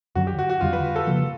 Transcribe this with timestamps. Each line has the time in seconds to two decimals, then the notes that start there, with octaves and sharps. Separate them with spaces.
0.15 F#2 D3 F#3 F#4
0.27 G4
0.39 F#4
0.49 F#4
0.61 F2 D3 G3 F4
0.73 B4
0.96 A4
1.07 C#3 F3 A#3